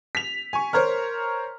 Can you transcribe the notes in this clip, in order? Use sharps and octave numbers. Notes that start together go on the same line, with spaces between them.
B6 F7
G#5 C#6
A#4 C5 C#5 A#5 F6